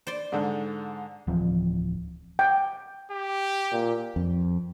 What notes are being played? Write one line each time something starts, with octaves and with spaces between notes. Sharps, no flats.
C5 D5 C6
G#2 D3
D1 E3 F3 C4
G5
G4
A#2
F2